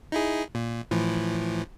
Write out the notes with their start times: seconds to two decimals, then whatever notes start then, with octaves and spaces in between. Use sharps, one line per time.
0.12 D#4 E4 G#4
0.55 A#2
0.91 A2 E3 F3